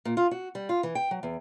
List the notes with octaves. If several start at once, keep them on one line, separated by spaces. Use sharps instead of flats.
A#2
F4
F#4
G3
F4
E3
G5
F#3
E2